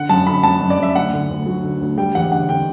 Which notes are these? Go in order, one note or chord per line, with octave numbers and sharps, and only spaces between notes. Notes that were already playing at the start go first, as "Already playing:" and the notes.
Already playing: D3 F#5
F#2 A5
D3 B5
F#2 A5
F#2
D5
F#2 E5
D2 F#5
D3
D2
F#3
D3
D2
G3 G5
E2 F#5
D3 F#5
D3 G5